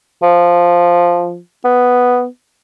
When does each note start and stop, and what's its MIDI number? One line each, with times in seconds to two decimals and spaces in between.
0.23 1.39 53
1.65 2.26 59